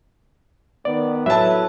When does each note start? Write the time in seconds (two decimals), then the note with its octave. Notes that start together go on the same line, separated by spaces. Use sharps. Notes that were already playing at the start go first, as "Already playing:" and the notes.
0.85 D#3 B3 D5
1.26 F#3 E4 A4 B4 E5 A5